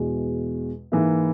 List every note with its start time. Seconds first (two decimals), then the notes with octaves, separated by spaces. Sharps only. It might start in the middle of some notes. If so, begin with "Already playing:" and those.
Already playing: E2 B2 G#3
0.92 G#2 E3 A#3 E4